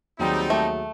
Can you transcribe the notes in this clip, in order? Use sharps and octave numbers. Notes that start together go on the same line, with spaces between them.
D#2 F#3 G3 C4 D#4 G#4
A3